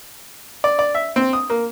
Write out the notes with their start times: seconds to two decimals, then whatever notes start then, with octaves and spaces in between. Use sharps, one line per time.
0.64 D5
0.79 D5
0.95 E5
1.16 C4
1.33 D#6
1.50 A#3